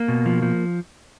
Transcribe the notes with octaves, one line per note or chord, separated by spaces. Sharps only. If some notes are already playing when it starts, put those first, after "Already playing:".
Already playing: A#3
B2
F3
F3